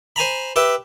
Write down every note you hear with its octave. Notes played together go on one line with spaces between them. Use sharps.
C5 G#5 A#5 B5
G4 B4 E5 G5